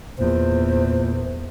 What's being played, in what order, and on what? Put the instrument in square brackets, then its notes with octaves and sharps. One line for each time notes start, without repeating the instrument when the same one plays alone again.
[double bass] E2 [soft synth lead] A#2 [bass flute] C5